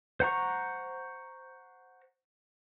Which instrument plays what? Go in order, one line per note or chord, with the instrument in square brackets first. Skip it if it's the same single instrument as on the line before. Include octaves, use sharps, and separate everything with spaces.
[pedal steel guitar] C5 F#5 A#5 C#6